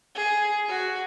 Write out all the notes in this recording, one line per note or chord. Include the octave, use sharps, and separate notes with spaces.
G#4
F#4